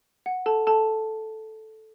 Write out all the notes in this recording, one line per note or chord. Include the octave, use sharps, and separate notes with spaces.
F#5
A4 A5
A4 A5